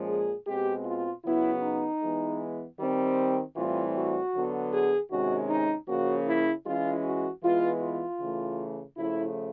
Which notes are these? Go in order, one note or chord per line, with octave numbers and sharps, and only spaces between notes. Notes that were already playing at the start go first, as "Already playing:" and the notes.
Already playing: A#2 F3 G#3 C#4
G#4
B2 G#3 C4 G4
F4
C#3 F#3 B3 E4
D#4
E3 G#3 B3
D#3 G3 C4
A2 E3 G3 C4 F4
F#4
D3 F#3 B3
G#4
C3 D#3 G#3 C#4 F#4
D#4
C#3 F3 A#3 C#4 F#4
E4
E3 G#3 C#4 F4
F#4
E3 G#3 B3 F4
F4
C#3 E3 A3
C#3 F3 A3 E4